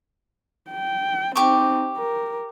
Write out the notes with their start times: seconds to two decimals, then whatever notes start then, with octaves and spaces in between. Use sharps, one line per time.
0.71 G5
1.36 C4 D#4 G4 C#6 D6
1.97 A#4